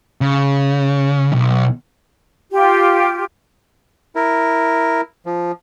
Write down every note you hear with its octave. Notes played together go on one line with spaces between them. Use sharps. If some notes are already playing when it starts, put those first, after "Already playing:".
C#3
B1
F4 G4
E4 A#4
F3